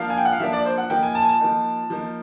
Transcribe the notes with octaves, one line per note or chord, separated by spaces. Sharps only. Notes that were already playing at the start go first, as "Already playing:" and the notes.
Already playing: F3 A#3 D4 F5
G#5
G5
F#5
F5
F3 A#3 D4 E5
D5
C5
F#5
F3 A#3 D#4 G5
G#5
A5
G#5
A5
F3 A#3 D#4
F3 A#3 D#4